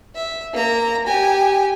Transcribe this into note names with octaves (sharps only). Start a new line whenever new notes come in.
E5
A#3 A#5
G4 G#5